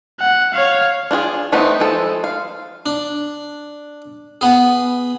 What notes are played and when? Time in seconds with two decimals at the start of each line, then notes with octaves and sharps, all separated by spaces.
0.20 F#5
0.54 C#5 F5
1.11 D4 F4 F#4 G#4
1.52 E3 A3 B3 C4 D#4
1.80 F3 G#3 A4
2.24 F5
2.86 D4
4.41 B3 G#4